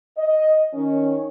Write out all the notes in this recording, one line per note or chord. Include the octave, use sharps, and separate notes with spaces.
D#5
D#3 C#4